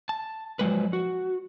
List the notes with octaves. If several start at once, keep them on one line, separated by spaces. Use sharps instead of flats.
A5
F3 F#3 G#3 B4
F#4